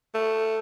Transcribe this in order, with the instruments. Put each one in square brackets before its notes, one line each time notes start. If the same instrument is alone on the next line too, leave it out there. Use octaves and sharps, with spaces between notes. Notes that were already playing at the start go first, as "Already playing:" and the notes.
[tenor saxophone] A3